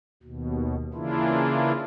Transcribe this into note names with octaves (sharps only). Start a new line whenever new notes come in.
D#2 B2
C#3 E3 A#3 D4 E4 F4